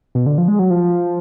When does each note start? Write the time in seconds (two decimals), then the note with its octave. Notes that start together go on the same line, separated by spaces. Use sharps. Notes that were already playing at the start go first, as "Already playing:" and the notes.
0.15 B2
0.26 D3
0.38 F3
0.48 G#3
0.59 F#3
0.70 F3